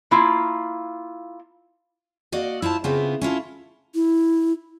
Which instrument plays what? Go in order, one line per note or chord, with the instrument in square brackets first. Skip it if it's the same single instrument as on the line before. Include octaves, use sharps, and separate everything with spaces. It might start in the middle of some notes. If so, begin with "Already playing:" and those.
[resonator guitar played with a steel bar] A#3 E4 F4
[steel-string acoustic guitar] A#3 F#4 D5 D#5
E4 F4 C5 A5
C#3 B3 C4 E4 F4
C#4 E4 F4 A4
[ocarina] E4